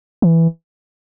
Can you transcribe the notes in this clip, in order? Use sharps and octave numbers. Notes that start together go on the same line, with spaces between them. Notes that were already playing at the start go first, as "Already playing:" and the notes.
E3